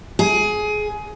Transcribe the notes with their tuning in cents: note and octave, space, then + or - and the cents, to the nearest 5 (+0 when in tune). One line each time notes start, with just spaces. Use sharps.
G#4 +20